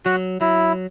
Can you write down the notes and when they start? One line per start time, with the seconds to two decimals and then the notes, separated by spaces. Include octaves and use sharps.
0.05 F#3 F#4
0.41 F#3 E4